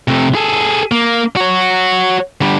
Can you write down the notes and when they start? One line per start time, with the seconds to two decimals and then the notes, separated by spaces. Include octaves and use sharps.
0.08 C3 A3
0.35 G#4 A4
0.92 A#3
1.36 F#4 C#5
2.41 D3 G3